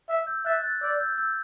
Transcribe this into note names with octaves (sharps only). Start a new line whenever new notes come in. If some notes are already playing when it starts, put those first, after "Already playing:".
E5
E6 G6
E5 F#6 A6
F#6 A6
D5 E6 G6
E6 G6
E6 G6